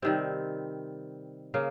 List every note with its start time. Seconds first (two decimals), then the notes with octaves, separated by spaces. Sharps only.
0.02 C3 D#3 G3 C4
1.54 C#3 A#3